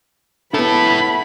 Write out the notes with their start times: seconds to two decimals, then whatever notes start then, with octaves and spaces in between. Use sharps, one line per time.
0.54 B3 E4 A4 A5 B5